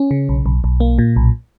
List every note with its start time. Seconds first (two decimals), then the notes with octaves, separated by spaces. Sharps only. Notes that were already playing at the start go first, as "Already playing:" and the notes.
Already playing: C#4
0.11 C#3
0.29 B1
0.46 B1
0.64 B1
0.80 A#3
0.98 A#2
1.16 B1